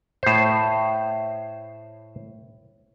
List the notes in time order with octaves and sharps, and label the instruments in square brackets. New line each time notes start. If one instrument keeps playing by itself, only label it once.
[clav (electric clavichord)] A2 C5